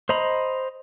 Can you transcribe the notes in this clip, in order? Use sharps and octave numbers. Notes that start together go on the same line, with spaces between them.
C5 D#5 A#5 B5